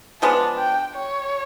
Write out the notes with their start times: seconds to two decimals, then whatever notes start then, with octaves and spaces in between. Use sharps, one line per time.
0.21 F3 G#3 B3 D4 A5
0.58 G5
0.96 C#5